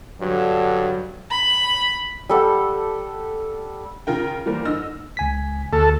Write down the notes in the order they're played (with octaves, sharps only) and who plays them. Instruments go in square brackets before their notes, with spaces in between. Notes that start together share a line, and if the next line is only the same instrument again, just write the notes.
[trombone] G2 [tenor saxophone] D3 [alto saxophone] F#3
[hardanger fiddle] B5
[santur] G3 A4 F#5
[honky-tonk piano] C#3 F4 A#4 G5
E3 G3 A#3 A#4 C5
D3 D#4 E6 F6 A#6
[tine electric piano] C#2 G#5 B6
[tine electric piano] D2 [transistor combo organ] A4